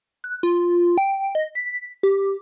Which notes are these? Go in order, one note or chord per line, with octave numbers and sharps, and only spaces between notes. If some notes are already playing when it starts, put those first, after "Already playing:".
F#6
F4
G5
D#5
B6
G4